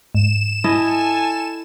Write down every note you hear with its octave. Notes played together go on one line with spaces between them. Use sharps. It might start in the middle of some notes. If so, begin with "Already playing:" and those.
G#2 E7
E4 A4 D#5 G#5 A5